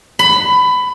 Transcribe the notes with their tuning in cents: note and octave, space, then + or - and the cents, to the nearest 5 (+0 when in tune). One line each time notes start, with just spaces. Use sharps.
B5 +20